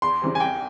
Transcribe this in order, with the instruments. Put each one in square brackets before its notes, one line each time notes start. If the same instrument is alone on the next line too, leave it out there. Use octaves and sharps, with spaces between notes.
[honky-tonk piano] E2 [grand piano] C6
[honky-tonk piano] C#3 E3 G3 C4
[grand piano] G#5
[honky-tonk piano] C2 [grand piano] G5